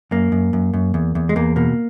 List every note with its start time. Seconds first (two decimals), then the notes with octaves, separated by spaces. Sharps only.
0.11 F#2 A#3
0.32 F#2
0.53 F#2
0.74 F#2
0.94 E2
1.15 E2
1.29 G#3
1.36 E2 A#3
1.56 B2 A#3